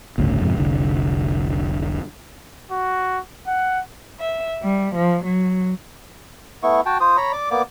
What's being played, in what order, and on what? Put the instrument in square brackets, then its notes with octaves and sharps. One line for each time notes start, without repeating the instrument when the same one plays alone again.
[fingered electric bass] G1 D2 A2 C#3
F2 G#2 C3
F1 C2 D3
[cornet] F#4
F#5
[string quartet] E5
G3
F3
F#3
[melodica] A3 B3 E4 C#6
F#4 G5 A5
F4 C5 D#6
C#5 A#5 B5
D5 D6
A#3 B3 D5 D6